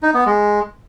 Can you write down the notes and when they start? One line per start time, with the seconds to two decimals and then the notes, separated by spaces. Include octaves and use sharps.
0.03 D#4
0.14 B3
0.26 G#3